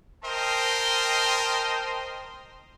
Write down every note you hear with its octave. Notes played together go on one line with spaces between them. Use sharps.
A#4 C5 D#5 G5 A5 C6